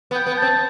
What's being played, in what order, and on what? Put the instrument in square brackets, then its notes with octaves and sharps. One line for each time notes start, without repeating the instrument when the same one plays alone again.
[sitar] B3
[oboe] G5
[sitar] B3
[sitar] C4 [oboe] A5